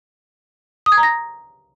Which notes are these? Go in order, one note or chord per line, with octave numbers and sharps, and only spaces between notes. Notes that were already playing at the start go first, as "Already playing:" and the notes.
D#6
G#6
A#5
A#6